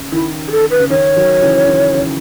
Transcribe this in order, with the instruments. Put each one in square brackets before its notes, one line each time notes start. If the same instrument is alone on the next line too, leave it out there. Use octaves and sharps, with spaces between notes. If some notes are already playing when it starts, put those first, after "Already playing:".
Already playing: [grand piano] C#3
[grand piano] D#3 [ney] E4
[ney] G#4
A4
B4
[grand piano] C#3
[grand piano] D#3 [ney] C#5
[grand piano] D#3 F#3
C#3 E3
D#3
C#3